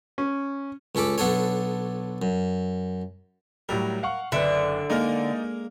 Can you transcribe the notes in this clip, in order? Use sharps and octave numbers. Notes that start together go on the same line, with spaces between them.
C#4
C#2 C#4 A4 B5 D6
B1 B3 D4 A4 C#5
F#2
A2 F#3 G3 A#4
F5 F#5 C#6
F#1 D3 B4 E5
G#3 A#3 D#4 D5 F6